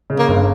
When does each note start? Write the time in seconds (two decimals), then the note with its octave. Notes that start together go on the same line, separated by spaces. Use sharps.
0.10 C#3
0.19 A#3
0.28 G1